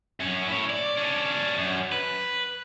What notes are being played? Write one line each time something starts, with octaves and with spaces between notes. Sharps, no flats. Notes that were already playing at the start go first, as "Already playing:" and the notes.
F#2 C#4
E4 C#5
D5
C#4 D4
F#2
B4